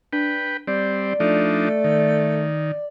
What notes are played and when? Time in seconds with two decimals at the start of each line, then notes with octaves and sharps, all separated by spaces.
0.13 D4 B4 G5
0.67 G3 C4 D5
1.20 F3 A3 D4 D#4
1.84 D#3